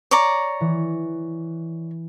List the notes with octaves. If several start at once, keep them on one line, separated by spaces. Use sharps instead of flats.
C#5 D5 A#5
E3